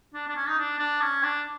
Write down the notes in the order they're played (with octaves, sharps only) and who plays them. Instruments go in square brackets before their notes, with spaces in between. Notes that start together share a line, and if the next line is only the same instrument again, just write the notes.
[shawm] D4
D4
C#4
D#4
D4
D4
C#4
D4